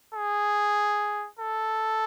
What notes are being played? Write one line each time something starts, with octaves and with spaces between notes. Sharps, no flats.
G#4
A4